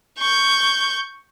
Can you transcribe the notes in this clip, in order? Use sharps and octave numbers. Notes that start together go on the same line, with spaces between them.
C#6 G6